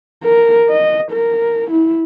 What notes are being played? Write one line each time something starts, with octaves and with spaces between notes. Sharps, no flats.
A#4
D#5
A#4
E4